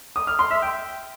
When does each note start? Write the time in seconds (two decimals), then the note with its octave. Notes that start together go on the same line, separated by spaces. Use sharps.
0.16 D#6
0.27 F6
0.39 C6
0.51 E5
0.62 G5